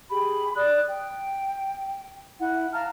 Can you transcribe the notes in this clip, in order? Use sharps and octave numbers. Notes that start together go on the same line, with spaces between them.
G4 G#4 B5
D5 D#6 F#6
G5
E4 F#5
F5 A5 A#5 F6